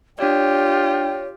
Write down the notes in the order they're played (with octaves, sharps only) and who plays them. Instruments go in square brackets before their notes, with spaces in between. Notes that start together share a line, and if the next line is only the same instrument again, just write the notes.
[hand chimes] D4 D5 [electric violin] F4 G4 [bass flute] C#5 [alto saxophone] G5